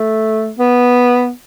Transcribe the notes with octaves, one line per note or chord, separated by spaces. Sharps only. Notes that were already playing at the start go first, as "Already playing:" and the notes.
Already playing: A3
B3